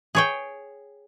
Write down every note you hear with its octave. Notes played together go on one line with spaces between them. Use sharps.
G#4 C#5 G5